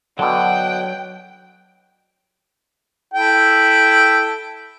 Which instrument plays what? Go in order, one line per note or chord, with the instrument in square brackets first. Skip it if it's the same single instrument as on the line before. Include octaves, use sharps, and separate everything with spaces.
[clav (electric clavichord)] B2 D3 [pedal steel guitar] F#3 A5 D#6 [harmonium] F#5 [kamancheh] G5
[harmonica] E4 A4 G5